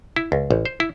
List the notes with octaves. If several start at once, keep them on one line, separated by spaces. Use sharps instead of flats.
E4
C#2
A1
C5
E4